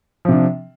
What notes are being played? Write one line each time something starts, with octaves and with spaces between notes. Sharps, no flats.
C3 F3 D4